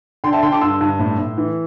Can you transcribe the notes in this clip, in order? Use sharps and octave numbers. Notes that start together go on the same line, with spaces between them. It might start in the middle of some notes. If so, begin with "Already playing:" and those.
D3 G5 C6
E5 A5
D3 G5 C6
A5 D6
G2 C6 E6
G2
A2
A2
E3